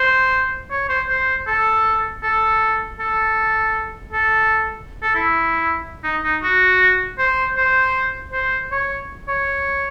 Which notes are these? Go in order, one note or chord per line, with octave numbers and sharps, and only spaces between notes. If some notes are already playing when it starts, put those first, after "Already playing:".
Already playing: C5
C#5
C5
C5
A4
A4
A4
A4
A4
E4
D#4
D#4
F#4
C5
C5
C5
C#5
C#5